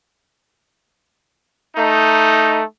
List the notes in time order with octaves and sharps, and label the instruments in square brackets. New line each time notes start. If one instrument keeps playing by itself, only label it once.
[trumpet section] A3 D#4